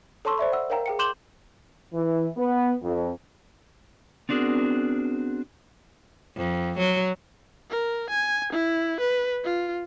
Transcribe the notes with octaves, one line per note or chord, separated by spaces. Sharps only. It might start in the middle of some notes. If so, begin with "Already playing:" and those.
A4 C#5 A5 C6 C#6 E6
C5 D5 E5 B5
F#5 E6
A#4 C#5 F5 G5 A#5
G#4 G5 C#7
C6 D6 G6 E7 F#7 G7
E3
B3
F2
B3 C4 D4 F#4 G#4 A#4
F2
F#3
A#4
G#5
E4
B4
F4